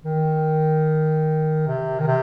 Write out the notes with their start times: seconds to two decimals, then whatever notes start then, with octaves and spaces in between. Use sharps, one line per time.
0.05 D#3
1.67 C3
2.00 D#3
2.07 C3